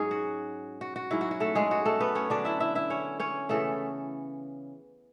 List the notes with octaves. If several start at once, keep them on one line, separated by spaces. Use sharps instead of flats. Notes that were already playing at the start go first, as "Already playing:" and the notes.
Already playing: G#2 F#3 C#4 G#4
F#4
F#4
F#4
G#2 F#3 C#4 E4
F#4
F#4
A3 A4
G#3 G#4
F#4
A3 A4
B3 B4
C#4 C#5
D3 F#3 C#4 D4 D5
E4 E5
E4 E5
E4 E5
C#4 C#5
C#4 C#5
C#3 E3 A3 B3 A4